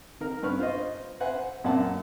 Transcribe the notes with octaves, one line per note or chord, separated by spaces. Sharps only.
D#3 A#4
G2 B3 B4 C#6 F6
F4 C5 D#5
B4 C5 E5 F#5 G#5
F#2 A#2 E5 F#5 A5